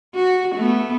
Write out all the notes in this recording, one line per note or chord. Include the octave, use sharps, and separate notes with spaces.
F#4
A3 B3